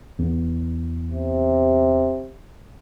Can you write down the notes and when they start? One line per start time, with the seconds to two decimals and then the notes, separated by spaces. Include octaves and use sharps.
0.19 E2
1.11 C3